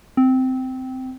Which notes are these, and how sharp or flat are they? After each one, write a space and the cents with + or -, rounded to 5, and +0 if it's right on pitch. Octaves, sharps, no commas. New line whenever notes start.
C4 -15